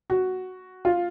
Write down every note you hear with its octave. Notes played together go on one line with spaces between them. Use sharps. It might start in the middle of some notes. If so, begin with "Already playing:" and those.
F#4
F4